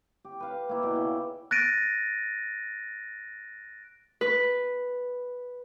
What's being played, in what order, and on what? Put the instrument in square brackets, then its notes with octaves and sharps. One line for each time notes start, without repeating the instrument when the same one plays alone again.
[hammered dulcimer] G4
B4 F5
A#3 E4
B2 D5 G5
C#3
[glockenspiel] F#6 A6 A#6 D7 D#7
[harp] B4